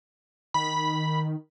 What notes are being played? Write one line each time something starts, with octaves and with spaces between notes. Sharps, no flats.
D#3 B5